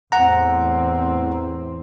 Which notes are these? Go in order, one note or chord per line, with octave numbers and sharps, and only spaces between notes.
E2 A2 C4 F#5 A#5